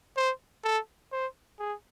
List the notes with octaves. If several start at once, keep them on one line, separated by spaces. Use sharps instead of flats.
C5
A4
C5
G#4